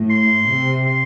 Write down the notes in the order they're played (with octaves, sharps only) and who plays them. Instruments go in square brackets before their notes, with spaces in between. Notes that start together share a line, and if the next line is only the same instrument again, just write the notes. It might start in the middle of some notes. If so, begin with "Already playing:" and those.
Already playing: [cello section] A2
[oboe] C6
[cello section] C3
[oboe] C6